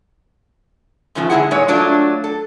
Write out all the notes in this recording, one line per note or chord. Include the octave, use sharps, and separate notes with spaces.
G#2 C#3 F3 A3
D3 G#3 D4 E4 G#4 F#5
A#2 G#3 D#4 C#5
F#3 A3 D4 F4
A4